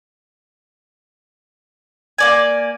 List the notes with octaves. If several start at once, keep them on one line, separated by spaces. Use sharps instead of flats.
A#3 D5 G#5